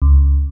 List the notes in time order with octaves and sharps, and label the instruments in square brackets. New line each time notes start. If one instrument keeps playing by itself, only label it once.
[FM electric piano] C#2